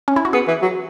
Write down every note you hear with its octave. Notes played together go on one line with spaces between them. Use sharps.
C#4
E4
F#4
B3 G#4
E3
F#3